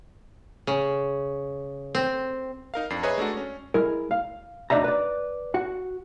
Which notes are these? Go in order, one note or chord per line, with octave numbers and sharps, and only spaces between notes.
C#3
C4
D#4 A#4 F5
F2 D4 C7
G#4 B4 C#5 D#5 E5 A#5
G#3 A3 D4 F#4
C#4
G#3 E4 A#4
F5
D2 D4 D#4 D5 E5 A#5
B4 D5
F#4 F#5